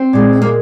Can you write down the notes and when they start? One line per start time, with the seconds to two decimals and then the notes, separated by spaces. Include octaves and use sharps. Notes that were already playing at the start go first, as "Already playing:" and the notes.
Already playing: C4
0.13 A#2 G#3
0.42 A#3